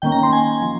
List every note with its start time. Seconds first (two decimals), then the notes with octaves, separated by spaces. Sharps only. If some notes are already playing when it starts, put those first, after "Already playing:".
0.02 D#3 A#3 C#4 G5
0.12 A#5
0.23 C6
0.33 G#5
0.62 F3